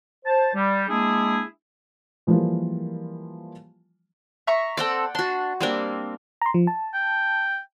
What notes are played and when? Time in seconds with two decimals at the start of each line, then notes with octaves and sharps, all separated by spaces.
0.25 C5 A5
0.54 G3
0.88 G#3 A#3 D4 E4 G#4
2.27 E3 F3 G3 G#3 A#3 F4
4.47 E5 A#5 C#6
4.77 C4 A4 D5 F#5 G5
5.15 D4 F#4 C6
5.61 G3 A#3 C4 D4
6.42 A#5 C6
6.54 F3
6.67 A5
6.94 G5